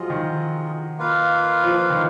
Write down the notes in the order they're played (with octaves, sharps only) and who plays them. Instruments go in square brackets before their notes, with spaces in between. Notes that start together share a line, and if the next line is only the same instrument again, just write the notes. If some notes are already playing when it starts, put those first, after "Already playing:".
Already playing: [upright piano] F3 F#3 [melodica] F4 G#4 D#5
[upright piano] D#3
[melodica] A#3 F4 B4 F5
[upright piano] F3
D#3